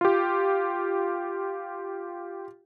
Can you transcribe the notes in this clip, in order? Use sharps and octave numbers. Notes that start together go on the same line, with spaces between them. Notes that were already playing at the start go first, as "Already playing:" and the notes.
F4 G4